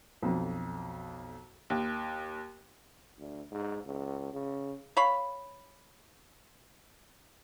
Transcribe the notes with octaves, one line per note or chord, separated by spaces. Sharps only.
B1 F2
D#2
D2
G#2
C#2
C#3
C#5 F5 B5